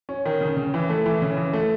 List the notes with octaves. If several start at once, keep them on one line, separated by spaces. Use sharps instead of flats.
C#4
D#3
C#3
C#3
E3
A3
E3
C#3
E3
A3